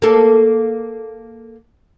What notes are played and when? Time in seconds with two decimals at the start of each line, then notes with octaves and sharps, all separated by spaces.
0.02 A#3 A4